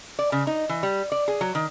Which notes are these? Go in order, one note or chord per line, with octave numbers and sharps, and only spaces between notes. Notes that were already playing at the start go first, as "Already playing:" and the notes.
D5
C#3
D#4
E3
G3
D5
G#4
F#3
D#3